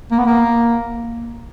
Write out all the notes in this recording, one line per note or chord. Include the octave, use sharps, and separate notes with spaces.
A#3
B3
A#3